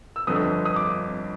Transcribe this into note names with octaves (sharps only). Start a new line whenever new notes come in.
E6
G1 F2 D3 D#6
D#6
D6